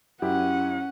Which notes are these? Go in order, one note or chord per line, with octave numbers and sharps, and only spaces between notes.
F#2 C#4 E4 G4 F#5